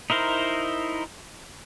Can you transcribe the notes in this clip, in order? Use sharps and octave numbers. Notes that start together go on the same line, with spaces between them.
D#4 E4 A#4 C5